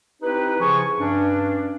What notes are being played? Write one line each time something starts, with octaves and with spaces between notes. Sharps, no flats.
C4 D#4 E4 G4 B4
C#3 F3 G#4 G#5 C#6
G2 C#4 D4